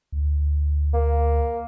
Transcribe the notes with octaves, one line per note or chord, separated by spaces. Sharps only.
D2
A#3